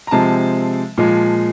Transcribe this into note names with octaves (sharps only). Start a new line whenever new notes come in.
A#5
C3 F3 G#3 C4 A5
A#2 F3 G#3